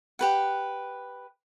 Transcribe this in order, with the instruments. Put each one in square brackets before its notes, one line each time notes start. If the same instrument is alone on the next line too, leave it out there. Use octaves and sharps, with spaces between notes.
[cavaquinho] G4 B4 F#5